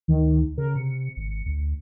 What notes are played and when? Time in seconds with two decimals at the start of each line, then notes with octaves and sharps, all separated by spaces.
0.08 D2 D#3
0.58 C#3 A#4
0.76 C3 C#7
1.17 G#1
1.46 D2